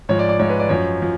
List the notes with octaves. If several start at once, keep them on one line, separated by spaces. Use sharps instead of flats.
G#2 F3 C#5
D5
D5
G#2 F3 C#5
B4
D5
F#2 F3 C#5
F3